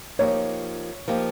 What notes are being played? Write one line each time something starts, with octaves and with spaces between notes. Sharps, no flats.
F3 A#3 D#4 G4 C#5
F3 A#3 D#4 G4